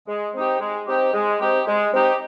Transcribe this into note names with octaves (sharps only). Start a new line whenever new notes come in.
G#3
C4 D#4 G4
G#3
C4 D#4 G4
G#3
C4 D#4 G4
G#3
C4 D#4 G4